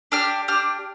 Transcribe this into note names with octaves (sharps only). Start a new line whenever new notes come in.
D4 G4 F6
D4 G4 F6